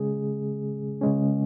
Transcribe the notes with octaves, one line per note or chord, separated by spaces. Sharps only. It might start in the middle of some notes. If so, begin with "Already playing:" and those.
Already playing: C#3 G#3 C#4 G#4
C#3 G#3 C#4